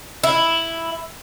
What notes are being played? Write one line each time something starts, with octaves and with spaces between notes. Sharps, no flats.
E4